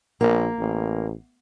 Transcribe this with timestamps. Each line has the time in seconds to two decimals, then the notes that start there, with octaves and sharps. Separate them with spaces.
0.21 A#1 A#3
0.59 A1